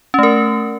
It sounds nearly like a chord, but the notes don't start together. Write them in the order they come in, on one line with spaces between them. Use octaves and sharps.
C#4 A3 A#4